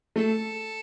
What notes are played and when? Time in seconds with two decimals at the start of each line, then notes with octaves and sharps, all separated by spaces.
0.16 A3 A4